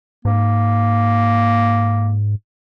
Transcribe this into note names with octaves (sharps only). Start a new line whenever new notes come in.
G#2 A#3